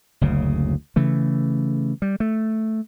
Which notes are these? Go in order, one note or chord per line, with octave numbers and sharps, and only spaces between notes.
F#1 D2 C#3
C#3 E3 A3
G3
A3